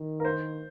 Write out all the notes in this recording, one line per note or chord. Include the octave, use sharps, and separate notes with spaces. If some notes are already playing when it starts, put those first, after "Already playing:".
Already playing: D#3
A#4
C5